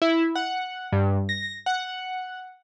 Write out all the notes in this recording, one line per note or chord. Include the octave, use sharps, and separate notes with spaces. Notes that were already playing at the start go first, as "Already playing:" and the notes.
E4
F#5
G2
A#6
F#5